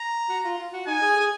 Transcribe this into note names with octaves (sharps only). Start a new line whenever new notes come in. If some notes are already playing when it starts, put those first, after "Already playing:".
Already playing: A#5
F#4
F4
F4
F#4
D#4 G#5
G#4
G#4